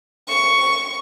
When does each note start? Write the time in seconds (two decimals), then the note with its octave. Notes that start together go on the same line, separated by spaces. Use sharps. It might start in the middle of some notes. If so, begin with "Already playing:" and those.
0.28 C#6